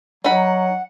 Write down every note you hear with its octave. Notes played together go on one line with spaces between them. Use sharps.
F#3 D#4 F#5 B5